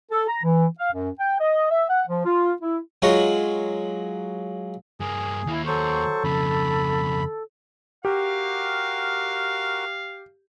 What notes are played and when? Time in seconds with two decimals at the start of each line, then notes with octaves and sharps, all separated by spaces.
0.12 A4
0.28 A#5
0.43 E3
0.79 F5
0.93 F#2
1.20 G5
1.40 D#5
1.71 E5
1.90 F#5
2.08 F3
2.26 F4
2.62 E4
3.02 F#3 G#3 F4 F#4 C#5
5.00 G2 A#3 G#4
5.47 D#2 A#3 E4
5.66 F#3 A4 C5 C#6
6.24 F2 C#3 B5
8.05 F#4 G4 A#4 F5